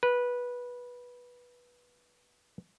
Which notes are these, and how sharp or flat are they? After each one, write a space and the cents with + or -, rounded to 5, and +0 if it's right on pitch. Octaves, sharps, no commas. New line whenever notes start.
B4 -15